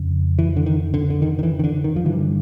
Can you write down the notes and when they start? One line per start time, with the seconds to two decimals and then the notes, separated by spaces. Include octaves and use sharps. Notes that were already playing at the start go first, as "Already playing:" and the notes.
Already playing: F2 C#3
0.39 E3
0.57 D3
0.66 D#3
0.94 D3
1.10 D3
1.22 D#3
1.39 D#3
1.43 E3
1.59 D#3
1.64 D3
1.84 D#3
1.96 F3
2.05 G2 D3 E3